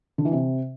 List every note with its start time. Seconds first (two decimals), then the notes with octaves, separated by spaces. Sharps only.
0.18 D3
0.25 E3
0.32 C3